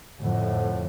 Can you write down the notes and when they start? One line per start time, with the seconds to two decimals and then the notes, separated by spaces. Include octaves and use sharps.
0.21 F2 A2 D3